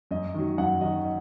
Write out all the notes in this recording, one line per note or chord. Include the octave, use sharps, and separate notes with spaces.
F#2 D#5
D#3 F#3
F#2 F#5
D#3 F#3 D#5
D#5